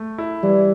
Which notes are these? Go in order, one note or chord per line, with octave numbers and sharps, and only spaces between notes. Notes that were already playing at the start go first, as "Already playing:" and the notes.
Already playing: A3
E4
E3 G3